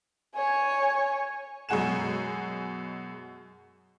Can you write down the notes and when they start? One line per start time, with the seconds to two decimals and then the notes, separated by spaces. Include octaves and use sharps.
0.35 C#5 G#5
1.69 F#2 B2 G#3 F#5 G#5 E7